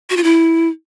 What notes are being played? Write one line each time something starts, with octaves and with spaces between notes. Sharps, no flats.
F#4
F4
E4